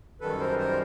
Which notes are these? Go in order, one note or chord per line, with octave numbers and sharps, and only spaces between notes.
F#2 D#3 G3 A4 B4
A#4 C5
A#4 C5